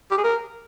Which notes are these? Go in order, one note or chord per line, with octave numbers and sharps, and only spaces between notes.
G4
G#4
A#4